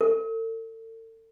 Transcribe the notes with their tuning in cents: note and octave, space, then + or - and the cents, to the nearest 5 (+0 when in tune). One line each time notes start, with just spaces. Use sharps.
A4 +40